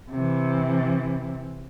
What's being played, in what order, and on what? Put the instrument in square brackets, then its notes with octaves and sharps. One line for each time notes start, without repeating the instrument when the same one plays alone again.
[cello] C3 E3